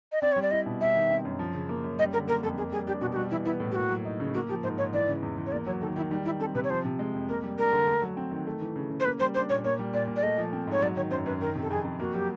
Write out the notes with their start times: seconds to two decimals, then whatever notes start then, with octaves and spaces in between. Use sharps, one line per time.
0.12 D#5
0.22 C4 D5
0.32 G3 C#5
0.42 D5
0.51 E4 D#5
0.66 B2
0.81 G3 E5
0.96 D#3
1.11 C4
1.25 F#2
1.39 F3
1.54 C#3
1.69 A#3
1.84 F#2
1.99 G3 D#5
2.13 D3 A#4
2.27 A#3 A#4
2.43 F2 A4
2.58 A#3 G#4
2.72 G3 G#4
2.87 D4 G4
3.01 B2 F#4
3.12 G4
3.16 G3 F#4
3.31 E3 E4
3.45 B3 E4
3.60 A2
3.72 G4
3.75 A#3 F#4
3.90 F#3
4.05 D#4
4.20 C#3
4.34 A#3 F#4
4.49 F3 G4
4.63 G#2 C5
4.78 G#2 C#5
4.93 E3 D5
5.08 C#3
5.23 E2
5.38 E2
5.46 C#5
5.52 A#3 D5
5.67 F#3 C#5
5.81 D#3 A4
5.96 D#3 E4
6.11 G3 D#4
6.25 D#3 E4
6.40 C4 A4
6.55 C3 B4
6.64 C#5
6.70 F3 C5
6.85 C3
6.99 G#3
7.14 F2
7.29 A#3 A#4
7.43 G3
7.58 D4 A#4
7.73 D3
7.87 A3
8.02 F#3
8.17 C4
8.31 D#3
8.47 A3
8.62 E3
8.76 C#3
8.90 C#3
9.00 C5
9.05 A#3 B4
9.20 G3 C5
9.35 D4 C5
9.49 A#2 C#5
9.64 A#3 C#5
9.79 G3
9.94 A#2 D5
10.08 A#2
10.16 D5
10.23 A3 D#5
10.38 F3
10.53 C4
10.67 G#2 C#5
10.82 F#3 D5
10.97 D#3 C#5
11.11 F#2 C5
11.26 F#2 B4
11.41 D#3 A#4
11.55 C3
11.62 A4
11.70 F2 G#4
11.85 F2
12.00 A#3 F#4
12.14 F#3 G4